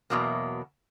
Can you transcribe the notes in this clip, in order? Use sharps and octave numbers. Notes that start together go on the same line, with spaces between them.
E2 G2 B2 F#3 A#3